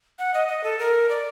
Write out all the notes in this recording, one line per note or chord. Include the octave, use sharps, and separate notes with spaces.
F#5
D#5
D#5
A4
A#4
D5